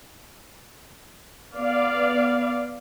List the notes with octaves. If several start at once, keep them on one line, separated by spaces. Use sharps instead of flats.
B3 D5 F5